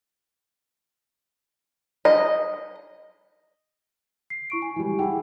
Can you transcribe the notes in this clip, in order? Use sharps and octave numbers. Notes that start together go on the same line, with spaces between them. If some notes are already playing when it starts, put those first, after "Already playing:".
D#5
C7
E4 C#6 D7
G#5
E3 G3
E4 G#4 F#5 G5